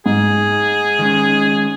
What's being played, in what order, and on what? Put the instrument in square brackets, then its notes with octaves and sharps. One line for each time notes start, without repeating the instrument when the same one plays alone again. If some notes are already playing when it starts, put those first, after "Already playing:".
[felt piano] G#2 [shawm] G#4
[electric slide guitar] D#3 G#3 C#4